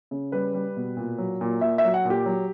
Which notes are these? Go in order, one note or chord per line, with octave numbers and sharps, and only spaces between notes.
C#3
G3 B4
G3
B2
A#2
F#3
A#2
A#2 E5
E5
F#3
F#5
A#2
G4
F#3